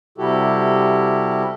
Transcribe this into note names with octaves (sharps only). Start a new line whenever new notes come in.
C3 G3 E4 F#4 G4 A4